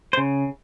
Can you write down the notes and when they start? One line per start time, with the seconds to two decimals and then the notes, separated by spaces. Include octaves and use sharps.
0.13 C5
0.17 C#3